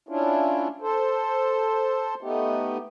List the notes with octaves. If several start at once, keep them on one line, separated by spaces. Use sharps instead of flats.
C#4 D4 E4 F4
A4 C5
A3 B3 D#4 G4